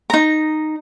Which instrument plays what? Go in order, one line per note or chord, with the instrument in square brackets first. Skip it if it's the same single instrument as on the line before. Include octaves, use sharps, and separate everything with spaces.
[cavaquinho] D#4 A#5